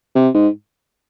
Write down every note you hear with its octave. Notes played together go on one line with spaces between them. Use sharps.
C3
G#2